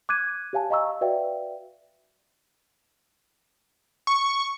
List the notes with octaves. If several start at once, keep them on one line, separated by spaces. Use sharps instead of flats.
D6 F#6 G#6 D#7
G4 C#5 F5 G#5 A5
D#5 F5 A#5 C#6 E6
F#4 B4 D5 E5 F5 G5
C#6